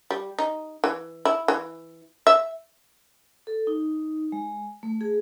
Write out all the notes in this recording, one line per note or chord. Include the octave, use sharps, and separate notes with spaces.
G3
D#4
E3
E4
E3
E5
A4
D#4
G#3
A3
G#4